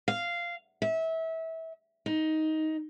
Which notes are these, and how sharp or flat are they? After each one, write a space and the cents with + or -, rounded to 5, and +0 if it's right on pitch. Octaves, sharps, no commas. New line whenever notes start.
F5 -10
E5 -25
D#4 +10